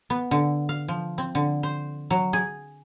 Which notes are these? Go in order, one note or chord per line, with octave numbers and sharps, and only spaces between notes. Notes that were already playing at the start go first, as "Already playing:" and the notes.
B3
D3
F5
F3
C4
D3
C5
F#3
G#4